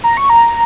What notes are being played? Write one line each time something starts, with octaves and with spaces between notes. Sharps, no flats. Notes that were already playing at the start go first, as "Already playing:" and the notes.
A#5
C#6
A#5